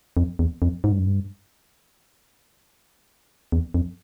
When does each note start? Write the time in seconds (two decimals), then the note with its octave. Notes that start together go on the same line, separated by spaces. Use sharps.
0.17 F2
0.39 E2
0.62 F2
0.84 G#2
0.91 G2
0.99 F#2
1.06 G2
3.52 E2
3.74 F2